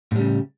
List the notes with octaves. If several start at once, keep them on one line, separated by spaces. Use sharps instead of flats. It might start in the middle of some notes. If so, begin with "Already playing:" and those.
A2 C#3 G3